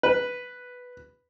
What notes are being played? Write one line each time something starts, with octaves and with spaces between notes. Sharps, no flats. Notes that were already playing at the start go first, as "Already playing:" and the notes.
B4